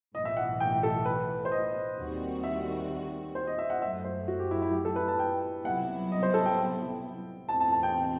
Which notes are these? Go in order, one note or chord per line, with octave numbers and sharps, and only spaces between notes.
B1 A2 E3 D#5
E5
F#5
G5
A4
B4
C5
D#5
D#2 D#3 G3 C4 F#4
E5
C5
D#5
E5
F#5
F#2 F#3 A3 E5
C5
F#4
G4
E4
E4
G4
A4
B4
A5
G5
C2 C3 F#3 B3 E4 F#5
D#5
C5
A4
G5
E2 B2 A3 C4 A5
A5
A5
G5